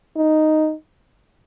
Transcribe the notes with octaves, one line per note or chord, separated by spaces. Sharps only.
D#4